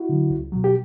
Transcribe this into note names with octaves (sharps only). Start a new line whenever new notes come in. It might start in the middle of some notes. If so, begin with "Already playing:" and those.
Already playing: E4 F#4
D3 F#3
C#2
B2 F#3
G4